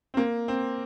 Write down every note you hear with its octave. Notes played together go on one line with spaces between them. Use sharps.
C4
A#3
C4